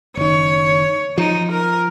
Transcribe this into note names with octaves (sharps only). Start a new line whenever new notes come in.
F#1 D#3 C#5
F3 D#4
A#4